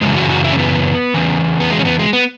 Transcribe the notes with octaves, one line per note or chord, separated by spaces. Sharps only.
F#2 C#3 E3 G#3
F#4
F#4
E4
C#4
B3
E2 C#3 E3
B3
G#3
C#4
B3
G#3
B3